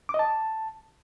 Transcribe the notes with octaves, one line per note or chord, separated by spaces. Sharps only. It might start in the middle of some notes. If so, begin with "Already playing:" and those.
D6
D#5
A5